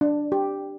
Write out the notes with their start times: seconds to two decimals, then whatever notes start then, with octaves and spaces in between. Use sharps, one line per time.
0.01 D4
0.32 G4